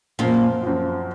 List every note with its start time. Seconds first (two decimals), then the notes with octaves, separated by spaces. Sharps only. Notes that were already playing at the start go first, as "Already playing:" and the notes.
0.19 F#2 A#2 F3 A#3 C4 F4
0.63 F#2 F3 C4 F4